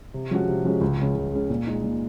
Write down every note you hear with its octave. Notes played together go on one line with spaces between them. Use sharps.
C3
F3 G#3 C#4 F#4
C3
F3 G#3 C#4 F#4
C#2
C#3 G#3 C#4
C#2
C#3 G#3 C#4
A#2
G#3 D#4
A#2